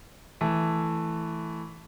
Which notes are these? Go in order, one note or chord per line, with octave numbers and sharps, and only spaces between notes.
E3 A3